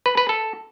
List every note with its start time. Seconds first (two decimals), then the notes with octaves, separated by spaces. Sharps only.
0.06 B4
0.17 B4
0.29 A4